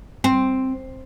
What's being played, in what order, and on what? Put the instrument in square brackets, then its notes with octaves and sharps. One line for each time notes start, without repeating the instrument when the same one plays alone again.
[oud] C4